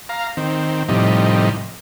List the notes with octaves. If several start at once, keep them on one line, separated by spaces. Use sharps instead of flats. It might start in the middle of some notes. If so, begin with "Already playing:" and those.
F5 A#5
D#3 C4
A2 C3 F3 G3 D#4